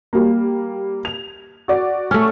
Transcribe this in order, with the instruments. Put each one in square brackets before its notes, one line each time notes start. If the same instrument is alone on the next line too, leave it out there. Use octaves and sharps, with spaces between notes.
[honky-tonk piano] G3 A#3
F7
F#4 D5
[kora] A3 C#4 [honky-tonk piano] C#6